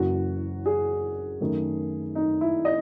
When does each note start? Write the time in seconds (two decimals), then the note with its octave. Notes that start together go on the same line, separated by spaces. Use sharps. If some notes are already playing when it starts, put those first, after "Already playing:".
Already playing: F#1 F#2 E3 F#4
0.66 G#4
1.41 F#2 D#3 A3
2.15 D#4
2.41 E4
2.65 D#5